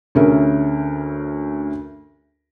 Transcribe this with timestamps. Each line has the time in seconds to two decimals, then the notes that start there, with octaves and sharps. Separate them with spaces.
0.15 D2 C#4 G#4 A#4 E5